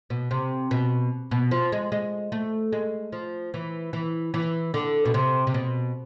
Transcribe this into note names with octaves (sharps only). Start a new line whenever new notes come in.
B2
C3
B2
B2
F3
G#3
G#3
A3
G#3
F3
E3
E3
E3
D3
B2
C3
C3
B2